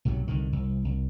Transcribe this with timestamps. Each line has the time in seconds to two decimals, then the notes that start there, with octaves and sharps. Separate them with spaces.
0.05 B1 G#2 C3 F#3
0.28 C2 D3 D#3
0.53 C2
0.85 C2